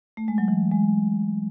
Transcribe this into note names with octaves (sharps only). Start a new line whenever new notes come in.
A3
G#3
F#3
E3
G#3